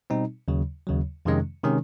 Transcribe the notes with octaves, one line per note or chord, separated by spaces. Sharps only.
B2 G3 C4 D#4
D#2 C#3 F#3
D#2 C#3 F#3
F2 C3 D#3 G#3 C#4
C3 D#3 G#3 C#4